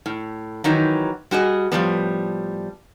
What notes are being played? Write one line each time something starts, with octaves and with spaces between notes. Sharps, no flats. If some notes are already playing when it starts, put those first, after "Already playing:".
A2
D#3 E3 F#3 D#4
G3 F#4 G#4 D#5
A2 F3 G3 B3